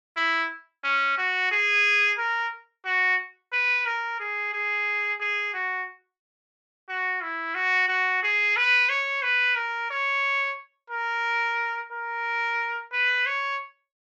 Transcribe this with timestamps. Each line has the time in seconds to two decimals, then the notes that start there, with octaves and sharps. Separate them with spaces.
0.17 E4
0.84 C#4
1.18 F#4
1.51 G#4
2.18 A#4
2.85 F#4
3.53 B4
3.86 A#4
4.20 G#4
4.53 G#4
5.20 G#4
5.53 F#4
6.89 F#4
7.22 E4
7.55 F#4
7.88 F#4
8.23 G#4
8.56 B4
8.89 C#5
9.22 B4
9.56 A#4
9.91 C#5
10.90 A#4
11.92 A#4
12.92 B4
13.26 C#5